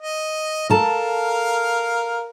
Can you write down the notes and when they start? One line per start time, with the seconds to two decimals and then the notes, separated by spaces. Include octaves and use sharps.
0.01 D#5
0.70 A4 A#4 F5 A5 A#5